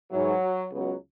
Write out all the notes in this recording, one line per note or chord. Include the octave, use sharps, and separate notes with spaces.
G#2 E3 F#3
C#2 B2 F#3